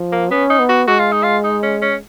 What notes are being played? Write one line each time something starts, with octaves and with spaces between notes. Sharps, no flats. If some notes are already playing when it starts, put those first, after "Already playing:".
Already playing: F3
A#3
B3 C#4
D#4
B3
F#4
G#3 F#4
F4
D#4
F4
D#4
C#4
C#4